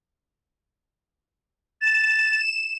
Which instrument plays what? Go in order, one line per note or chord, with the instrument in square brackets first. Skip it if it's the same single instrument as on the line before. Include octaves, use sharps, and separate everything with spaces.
[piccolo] A6 [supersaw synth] E7